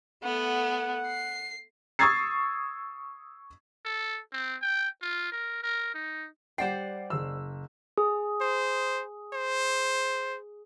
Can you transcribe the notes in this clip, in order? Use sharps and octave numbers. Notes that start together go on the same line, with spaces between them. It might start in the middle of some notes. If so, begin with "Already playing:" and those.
A3 B3 F#5
C7
C#6 D#6 E6 G#6 A6 C7
A4
C4
G5
F4
A#4
A#4
D#4
G3 C5 D5 F#5 G5 C7
F#1 E6
G#4
C5
C5